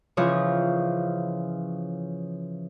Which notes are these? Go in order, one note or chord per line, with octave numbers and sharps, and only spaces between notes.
C#3 E3 F3 C#5 D#5